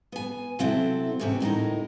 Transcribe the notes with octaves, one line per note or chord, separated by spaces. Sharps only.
B3 G#5
C3 F#3 C4 E4 A4
E2 G#2 C3 C4 C#4
D2 A2 D#4 A#4